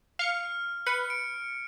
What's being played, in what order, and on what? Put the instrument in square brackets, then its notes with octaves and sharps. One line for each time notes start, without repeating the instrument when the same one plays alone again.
[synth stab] F5 C#7 [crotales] F6
[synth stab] B4 [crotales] C#7
[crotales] D7